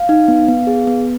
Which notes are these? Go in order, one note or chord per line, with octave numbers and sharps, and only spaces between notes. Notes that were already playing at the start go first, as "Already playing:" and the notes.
Already playing: F5
D#4
B3
B3
G#4
B3